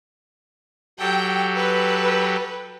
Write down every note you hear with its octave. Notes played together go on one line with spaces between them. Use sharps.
F#3 G4 A4 G5
B4